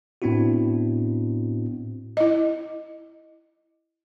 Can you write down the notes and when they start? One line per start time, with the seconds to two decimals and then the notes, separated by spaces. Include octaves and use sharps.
0.22 A2 B3 C4 D4 E4 F#4
2.17 E4 D#5